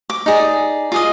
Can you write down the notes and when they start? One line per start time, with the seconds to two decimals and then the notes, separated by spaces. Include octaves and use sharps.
0.10 D6
0.26 D#4 G#4 D5
0.92 F4 G#4 D#5